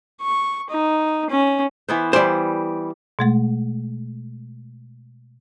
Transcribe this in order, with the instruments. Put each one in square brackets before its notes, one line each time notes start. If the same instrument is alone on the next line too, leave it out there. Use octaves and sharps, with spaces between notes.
[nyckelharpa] C#6
D#4
C#4
[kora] E3 B3 C5
[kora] E3 G3 [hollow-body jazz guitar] C5 D5
[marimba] B2 G#3 A3